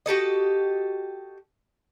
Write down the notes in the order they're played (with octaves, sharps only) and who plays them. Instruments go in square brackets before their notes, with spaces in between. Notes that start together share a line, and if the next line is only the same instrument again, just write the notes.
[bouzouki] F#4 G4 A4 D#5